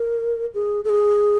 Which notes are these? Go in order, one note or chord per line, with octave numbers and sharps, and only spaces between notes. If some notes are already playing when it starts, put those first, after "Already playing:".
Already playing: A#4
G#4
A4
G#4